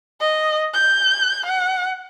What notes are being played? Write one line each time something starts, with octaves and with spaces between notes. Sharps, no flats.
D#5
G6
F#5